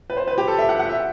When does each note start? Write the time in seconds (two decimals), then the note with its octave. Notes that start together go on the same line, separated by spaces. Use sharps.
0.10 B4
0.17 C5
0.28 B4
0.38 G4
0.48 A4
0.58 E5
0.69 F#5
0.79 F#5
0.89 E5